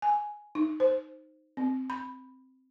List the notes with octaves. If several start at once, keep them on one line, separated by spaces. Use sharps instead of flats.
G#5
D#4
C5
C4
B5